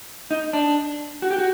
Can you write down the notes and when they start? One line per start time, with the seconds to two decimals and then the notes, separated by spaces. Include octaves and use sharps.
0.31 D#4
0.53 D4
1.22 F#4
1.31 G4
1.38 F#4